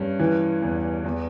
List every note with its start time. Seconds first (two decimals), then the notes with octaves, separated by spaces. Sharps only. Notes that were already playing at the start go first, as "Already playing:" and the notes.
Already playing: G2 C#4
0.19 E3
0.62 E2
1.04 E2